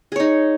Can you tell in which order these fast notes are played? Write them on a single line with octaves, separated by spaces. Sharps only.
G#4 C#5 D#4